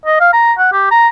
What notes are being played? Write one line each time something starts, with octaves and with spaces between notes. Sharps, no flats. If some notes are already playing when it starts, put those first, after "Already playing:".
D#5
F5
A#5
F#5
G4
A#5